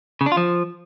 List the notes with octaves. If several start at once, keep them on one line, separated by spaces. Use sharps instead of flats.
C#3
D4
F4
F3